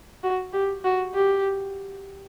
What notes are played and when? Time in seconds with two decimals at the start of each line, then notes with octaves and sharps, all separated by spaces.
0.23 F#4
0.53 G4
0.84 F#4
1.14 G4